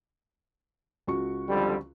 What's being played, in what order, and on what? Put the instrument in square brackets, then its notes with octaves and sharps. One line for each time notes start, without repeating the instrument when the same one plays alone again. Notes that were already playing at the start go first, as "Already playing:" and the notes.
[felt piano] C#2 F#4 C#6
[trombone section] F2 D3 G3